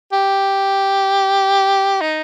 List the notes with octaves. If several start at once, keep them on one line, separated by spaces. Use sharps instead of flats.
G4
D#4